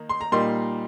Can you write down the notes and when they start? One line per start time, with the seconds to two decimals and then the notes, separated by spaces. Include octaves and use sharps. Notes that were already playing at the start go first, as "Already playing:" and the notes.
Already playing: D#3 A#3 D#4
0.09 C6
0.21 A#5
0.32 A#2 G3 A#3 D#4 C6